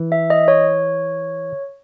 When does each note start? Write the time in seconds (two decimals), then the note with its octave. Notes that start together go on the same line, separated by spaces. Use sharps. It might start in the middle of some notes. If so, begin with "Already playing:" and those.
Already playing: E3
0.12 E5
0.30 D#5
0.48 C#5